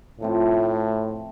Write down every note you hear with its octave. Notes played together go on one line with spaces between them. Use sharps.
A2 F3 A3 C4